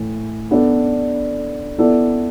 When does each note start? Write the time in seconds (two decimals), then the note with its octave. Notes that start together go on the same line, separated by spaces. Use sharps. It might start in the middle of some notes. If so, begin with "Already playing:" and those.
Already playing: A2 E3
0.51 B3 D4 A4 D5
1.78 B3 E4 A4 D5